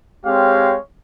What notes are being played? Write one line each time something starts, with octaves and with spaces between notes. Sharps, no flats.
G#3 C4 G4 C#5 F5